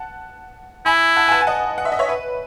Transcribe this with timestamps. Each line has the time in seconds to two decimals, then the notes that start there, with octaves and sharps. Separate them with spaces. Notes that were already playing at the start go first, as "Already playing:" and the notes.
Already playing: F#5 A5
0.86 E4 G#5 B5
1.16 F#5 A5
1.28 G#5
1.32 F#5 A5
1.41 G#5
1.47 D#5 F#5
1.78 F#5
1.85 E5
1.92 D#5
1.99 C#5 E5
2.09 B4